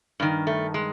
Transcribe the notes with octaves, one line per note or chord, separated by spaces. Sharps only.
G2 D#3
A3
G#3